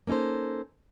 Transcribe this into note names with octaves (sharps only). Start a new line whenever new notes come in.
A#3 C#4 D#4 A4 C5